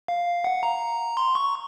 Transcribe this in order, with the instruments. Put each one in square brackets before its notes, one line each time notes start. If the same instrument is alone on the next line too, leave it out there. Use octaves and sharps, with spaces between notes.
[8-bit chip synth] F5
F#5
A#5
C6
C#6